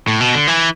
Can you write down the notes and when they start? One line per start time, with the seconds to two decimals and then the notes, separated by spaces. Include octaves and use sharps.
0.08 A2
0.21 B2
0.34 D3
0.47 E3